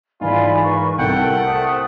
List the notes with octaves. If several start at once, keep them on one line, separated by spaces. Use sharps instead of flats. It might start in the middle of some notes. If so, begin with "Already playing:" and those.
G#2 E3 F4 D5 G#5 B5
A#3 B4 C#6
C2 A4 A#4 F#5 G5
A3 C5 A5 D#6